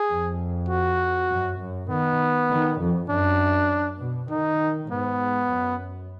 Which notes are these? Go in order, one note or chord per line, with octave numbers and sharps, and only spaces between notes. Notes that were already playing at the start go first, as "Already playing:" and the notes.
Already playing: G#4
F2
F#4
F#2
F#2
D#3 B3
D#3
F2
F#2 D4
B2
D#3 D#4
G#2 B3
F#2